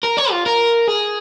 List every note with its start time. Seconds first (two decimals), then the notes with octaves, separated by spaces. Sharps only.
0.04 A#4
0.18 C#5
0.31 F4
0.46 A#4
0.88 G#4